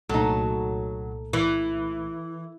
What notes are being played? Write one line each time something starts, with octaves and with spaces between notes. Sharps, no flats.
C2 A#2 F#3 A3 D#4 A4
E3